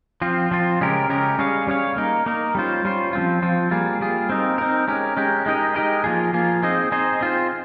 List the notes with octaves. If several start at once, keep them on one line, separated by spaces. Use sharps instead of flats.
F3 C4 F4
F3 C4 F4
C#3 G#3 C#4 G4 A#4
C#3 G#3 C#4 G4 A#4
G3 C#4 G#4 C#5 F5
G3 C#4 G#4 C#5 F5
A#3 D#4 A#4
A#3 D#4 A#4
G3 C#4 F4 C5
G3 C#4 F4 C5
F3 C4 F4
F3 C4 F4
G3 A#3 F4 G#4
G3 A#3 F4 G#4
C4 D#4 A#4
C4 D#4 A#4
G#3 C#4 G4 A#4
G#3 C#4 G4 A#4
G#3 D#4 G4 A#4 D#5
G#3 D#4 G4 A#4 D#5
F3 A#3 F4 G#4
F3 A#3 F4 G#4
C4 D#4 G#4 C5 D#5
C4 D#4 G#4 C5 D#5
C4 F4 C5